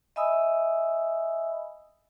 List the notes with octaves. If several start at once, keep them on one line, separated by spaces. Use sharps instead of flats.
D#5 E5 G#5 B5 D#6 E6